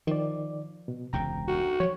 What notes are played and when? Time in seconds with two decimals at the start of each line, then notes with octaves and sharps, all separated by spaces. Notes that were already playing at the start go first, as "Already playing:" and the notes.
0.07 D#3 F3 D5
0.88 B2
1.13 E1 C#2 C3 G5 A#5
1.48 F#4
1.80 F3 F#3 C#5